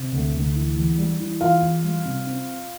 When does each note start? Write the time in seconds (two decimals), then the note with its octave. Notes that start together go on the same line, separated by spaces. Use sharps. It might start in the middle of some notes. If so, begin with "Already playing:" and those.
Already playing: C3
0.12 D2
0.34 D2
0.55 E3
0.77 E2
0.98 G3
1.19 E3
1.40 E2 F4 F5
1.62 E2
1.84 G3
2.05 C3
2.27 C4